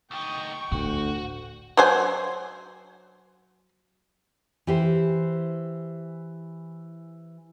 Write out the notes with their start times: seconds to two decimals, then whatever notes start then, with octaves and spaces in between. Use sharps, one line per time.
0.11 D2 D#4 G5 C#6
0.72 D2 A2 F#4
1.77 F#3 C5 G#5
4.67 E3 G4 C5